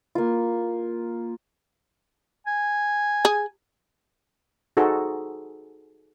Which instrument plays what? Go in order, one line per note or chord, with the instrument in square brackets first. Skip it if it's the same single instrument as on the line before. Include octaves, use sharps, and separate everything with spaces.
[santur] A#3 F4
[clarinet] G#5
[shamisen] G#4
[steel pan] D#4 F#4 G#4 A4 C5